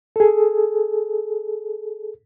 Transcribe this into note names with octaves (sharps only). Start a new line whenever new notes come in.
G#4 A4